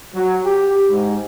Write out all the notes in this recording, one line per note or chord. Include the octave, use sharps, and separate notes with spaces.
F#3
G4
G#2